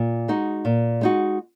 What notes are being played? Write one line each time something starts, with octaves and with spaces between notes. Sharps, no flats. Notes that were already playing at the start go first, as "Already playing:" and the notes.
Already playing: A#2
G#3 D#4 F#4
A#2
G#3 D#4 F#4